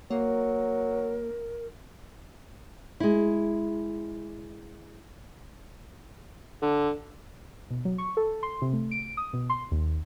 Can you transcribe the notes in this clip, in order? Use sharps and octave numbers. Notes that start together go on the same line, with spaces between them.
F#3 A#3 A#4
G#3 E4
D3
B2
F#3
C#6
A4
C6
C3
A3
D7
D#6
B2
C6
D#2